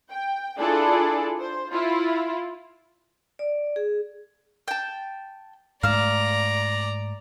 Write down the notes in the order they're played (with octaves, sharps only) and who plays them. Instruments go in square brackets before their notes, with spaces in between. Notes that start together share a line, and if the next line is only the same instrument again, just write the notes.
[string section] G5
D4 E4 F4 G#4 A4 D5
C5
E4 F4
[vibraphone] D5
G#4
[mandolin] G5 A5
[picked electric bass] G#2 A3 [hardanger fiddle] D5 A#5 [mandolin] F5 E6